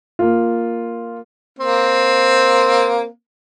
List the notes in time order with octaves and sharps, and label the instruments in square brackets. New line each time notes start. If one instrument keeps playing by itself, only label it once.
[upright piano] A#3 F4
[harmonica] A#3 C4